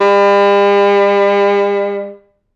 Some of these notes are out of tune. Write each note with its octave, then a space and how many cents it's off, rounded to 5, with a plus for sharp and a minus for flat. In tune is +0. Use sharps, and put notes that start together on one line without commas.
G3 +45